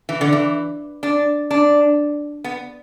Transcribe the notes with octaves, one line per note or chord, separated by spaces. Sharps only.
E3
D3
E3
D4
D4
B3